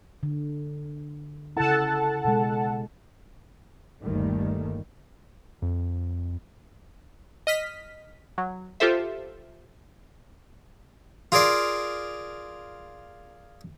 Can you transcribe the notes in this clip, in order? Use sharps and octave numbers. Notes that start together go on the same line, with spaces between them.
D3
C#3 E4 A4 F#5 A5
B2 G#3
G1 D#2 D#3 G3 A3
F2
D#5 F6 B6
F#3
F4 G4 A4 C5 E5
F4 G#4 A#4 D5 F5